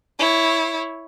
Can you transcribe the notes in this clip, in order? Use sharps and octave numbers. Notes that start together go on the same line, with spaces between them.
E4 C#5